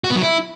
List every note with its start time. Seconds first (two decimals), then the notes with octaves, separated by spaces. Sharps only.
0.04 F#4
0.10 B3
0.16 F#3
0.22 E4